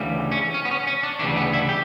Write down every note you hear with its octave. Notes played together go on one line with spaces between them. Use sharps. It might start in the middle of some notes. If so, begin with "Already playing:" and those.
Already playing: D2 C#3 E3 G3
C#4
C#4
B3
C#4
C#4
D4
D2 C#3 E3 G3 D4
B3
E4
G4